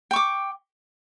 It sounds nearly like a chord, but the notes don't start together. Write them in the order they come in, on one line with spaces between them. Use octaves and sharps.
G5 C#6 D6